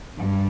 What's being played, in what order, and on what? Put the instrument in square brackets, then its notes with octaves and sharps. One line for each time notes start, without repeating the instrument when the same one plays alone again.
[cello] G2